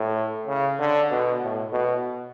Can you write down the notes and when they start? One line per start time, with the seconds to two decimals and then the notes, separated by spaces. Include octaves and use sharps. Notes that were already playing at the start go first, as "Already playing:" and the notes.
Already playing: A2
0.47 C#3
0.79 D3
1.11 B2
1.42 A2
1.73 B2